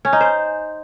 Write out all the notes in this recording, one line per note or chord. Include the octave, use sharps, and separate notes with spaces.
C#4
D#4
C5